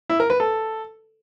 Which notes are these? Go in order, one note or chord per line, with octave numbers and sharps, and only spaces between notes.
E4
A#4
B4
A4